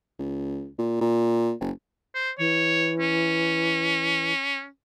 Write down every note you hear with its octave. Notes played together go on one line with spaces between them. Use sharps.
C#2
A#2
A#2
F#1
C5
E3 C#5
C#4